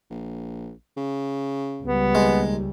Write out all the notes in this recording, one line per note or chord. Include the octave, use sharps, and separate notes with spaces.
A#1
C#3
C#2 G3 B3
D#2 G#3